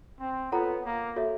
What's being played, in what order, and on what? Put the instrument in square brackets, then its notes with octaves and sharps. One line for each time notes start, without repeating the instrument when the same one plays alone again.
[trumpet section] C4
[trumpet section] B3 [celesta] F4 A4 C#5 F#5 A#5
[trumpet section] A#3
[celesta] F#4 A4 C#5 E5